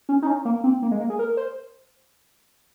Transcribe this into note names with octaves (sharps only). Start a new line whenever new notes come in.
C#4
D#4
C#4
A#3
C4
A#3
G#3
A#3
G#4
A#4
C5